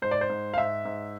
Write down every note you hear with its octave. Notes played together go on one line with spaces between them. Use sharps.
G#2 C5
D5
C5
G#2
F5
G#2 E5
G#2